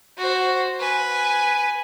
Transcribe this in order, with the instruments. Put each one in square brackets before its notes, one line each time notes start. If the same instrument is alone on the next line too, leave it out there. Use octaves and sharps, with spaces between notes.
[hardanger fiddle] F#4 C5
B4 G#5